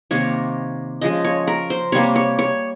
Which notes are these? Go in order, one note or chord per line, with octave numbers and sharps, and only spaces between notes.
C3 D#3 A#3 C#5
C#3 F3 G#3 D#5
C#5
A#4
C5
C3 G3 A#3 C#5
C#5
C#5